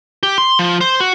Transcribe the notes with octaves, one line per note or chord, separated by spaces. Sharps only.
G4
C6
F3
C5
F#4